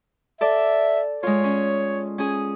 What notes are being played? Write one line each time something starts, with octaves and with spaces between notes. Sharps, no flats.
A4 D5 E5
G#3 F4 C#5
C#4
C#4 G#4